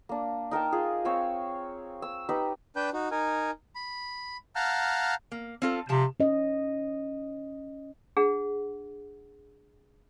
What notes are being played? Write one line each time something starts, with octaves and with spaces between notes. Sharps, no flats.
A#3 D4
D#4 A#4 G5 A5
F4 G#4
C4 C#5 F5 E6
E6
D#4 G4 B4
D4 B4 G5 G6
D#4 F#4
D#4 A#4 G#5
B5
F5 F#5 A5 A#5 F6 G6
A#3
C4 F4 A4
C3 F3 A5
C#4 D#5
D4 G#4 F#5